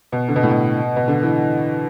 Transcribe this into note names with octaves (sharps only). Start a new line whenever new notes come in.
B2
D3
B2
A2
B2
B2
D3
E3